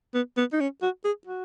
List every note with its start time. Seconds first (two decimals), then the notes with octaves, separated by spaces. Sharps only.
0.14 B3
0.37 B3
0.53 D#4
0.60 C#4
0.82 F#4
1.04 G#4
1.27 F#4